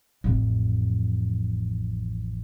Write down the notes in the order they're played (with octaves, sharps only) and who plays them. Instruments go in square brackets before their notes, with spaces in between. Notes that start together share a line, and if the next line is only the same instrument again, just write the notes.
[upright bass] A1 F2